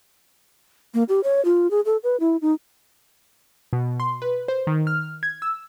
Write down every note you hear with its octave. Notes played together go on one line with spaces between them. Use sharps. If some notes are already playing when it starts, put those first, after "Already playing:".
A#3
G4
C#5
F4
G#4
A4
B4
E4
D#4
B2
C6
B4
C5
D#3
F6
G#6
E6